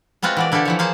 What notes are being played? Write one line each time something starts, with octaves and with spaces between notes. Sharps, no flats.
G#3 B3 C4 F4 F#4
E3 B3 D5
D3 E4 F4 G4 A4
E3 F3 C#5
A#3 G#4 C5 A5